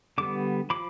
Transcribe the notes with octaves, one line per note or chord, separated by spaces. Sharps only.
D3 G3 B3 D6
F3 B5 D6